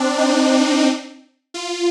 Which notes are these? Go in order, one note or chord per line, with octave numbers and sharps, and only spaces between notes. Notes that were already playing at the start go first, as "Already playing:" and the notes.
Already playing: C4 D4
D#4
F4